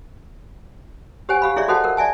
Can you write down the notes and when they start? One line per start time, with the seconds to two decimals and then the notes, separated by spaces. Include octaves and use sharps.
1.29 G4 C5 C#5 F#5 G#5
1.42 G4 F5 B5
1.56 E4 G#4 C#5 D5 E5
1.68 F#4 A4 C5 D#5 F#5 A5
1.84 A#4 F#5
1.97 D5 E5 G#5 A5